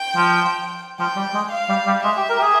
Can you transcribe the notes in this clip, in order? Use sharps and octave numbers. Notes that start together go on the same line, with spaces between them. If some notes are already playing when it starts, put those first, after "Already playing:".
Already playing: G5
F3
F3 G5
G3
G#3
F5
G3
G3
G#3 E5
G4
A#4
G4
G#4